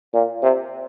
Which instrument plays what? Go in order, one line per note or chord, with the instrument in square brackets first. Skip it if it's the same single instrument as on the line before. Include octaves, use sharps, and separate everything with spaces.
[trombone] A#2
C3